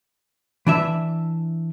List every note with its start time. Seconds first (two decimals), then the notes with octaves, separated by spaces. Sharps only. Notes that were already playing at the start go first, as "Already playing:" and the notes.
0.67 E3 D4 E5